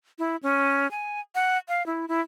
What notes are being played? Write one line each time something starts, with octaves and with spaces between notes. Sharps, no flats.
E4
C#4
G#5
F#5
F5
E4
E4